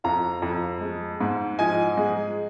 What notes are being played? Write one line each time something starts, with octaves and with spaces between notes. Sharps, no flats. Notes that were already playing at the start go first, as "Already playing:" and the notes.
F2 F5 A#5
F2
G#3
G#2
F3 D#5 G#5
G#3